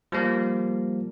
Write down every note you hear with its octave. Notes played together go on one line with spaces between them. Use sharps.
F3 G3 A#3